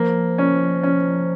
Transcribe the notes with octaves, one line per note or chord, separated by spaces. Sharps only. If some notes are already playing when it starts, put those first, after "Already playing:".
Already playing: F3 A#3
C#4
C#4